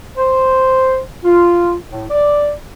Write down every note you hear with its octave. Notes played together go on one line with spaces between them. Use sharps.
C5
F4
A2
D5